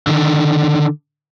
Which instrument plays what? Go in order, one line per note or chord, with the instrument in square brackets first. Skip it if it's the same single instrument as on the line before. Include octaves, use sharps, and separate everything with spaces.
[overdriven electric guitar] D3 D#3